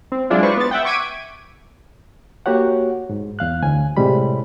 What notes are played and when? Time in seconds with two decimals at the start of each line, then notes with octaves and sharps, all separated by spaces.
0.12 C4
0.30 F#3 G#3 D4 E4 F4
0.43 B4 C5 D5 C#6
0.57 B3 A6
0.71 E5 F#5 G5
0.85 C#6 D6 G#6 B6 D7 D#7
2.46 A#3 F#4 G4 C#5 F#5
3.10 G#2
3.39 E2 F5 F#6
3.63 D2 G#5
3.97 A2 C3 G3 G#3 B5